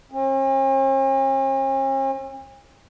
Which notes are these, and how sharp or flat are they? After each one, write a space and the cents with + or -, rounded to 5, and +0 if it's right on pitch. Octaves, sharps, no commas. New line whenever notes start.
C#4 -45